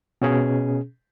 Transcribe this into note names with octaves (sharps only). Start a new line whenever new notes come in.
B2 C#4 G#4